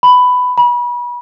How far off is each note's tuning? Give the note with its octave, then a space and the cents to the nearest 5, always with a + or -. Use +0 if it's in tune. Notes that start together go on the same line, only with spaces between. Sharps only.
B5 +10
B5 -30